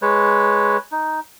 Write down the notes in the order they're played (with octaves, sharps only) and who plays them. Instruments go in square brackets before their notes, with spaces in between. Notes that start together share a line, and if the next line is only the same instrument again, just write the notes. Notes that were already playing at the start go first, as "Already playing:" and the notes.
[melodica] G#3 B4 C#5
D#4